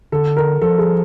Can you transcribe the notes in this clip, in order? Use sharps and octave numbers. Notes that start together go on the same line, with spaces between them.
D3 A4
A#4
F3 A4
G#4